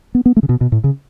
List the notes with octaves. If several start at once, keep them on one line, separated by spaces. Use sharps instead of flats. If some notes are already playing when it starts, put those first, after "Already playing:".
B3
B3
A3
C#3
B2
B2
A2
C#3